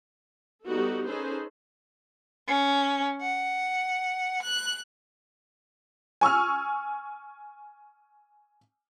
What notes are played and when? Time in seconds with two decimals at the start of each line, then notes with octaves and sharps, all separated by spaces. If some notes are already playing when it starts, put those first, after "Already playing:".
0.65 G3 B3 D#4 F#4 G4 A4
1.07 C#4 D#4 G#4 A4 B4 C5
2.47 C#4
3.21 F#5
4.43 F#6
6.21 G#5 C#6 E6 F6